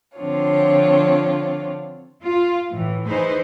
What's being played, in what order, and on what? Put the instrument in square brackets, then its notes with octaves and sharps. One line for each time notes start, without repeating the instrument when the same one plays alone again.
[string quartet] D3 F3 C4 D4 F4 C#5
[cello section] F4
A2 E3
E3 D#4 G#4 B4 C5